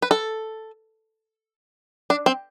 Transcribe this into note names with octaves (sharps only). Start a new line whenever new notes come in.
B4
A4
D4
C4